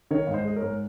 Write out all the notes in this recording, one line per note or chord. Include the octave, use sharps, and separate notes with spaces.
D#3 A#4 C#5
G#2 F5
C5 D#5
G#3 D#5
A#4 C#5
G#2